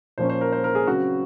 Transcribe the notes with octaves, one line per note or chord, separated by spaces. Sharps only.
A#2 F3 A#3 C#4 C5
C5
A#4
C5
A#4
G#4
C#3 F#3 C4 F#4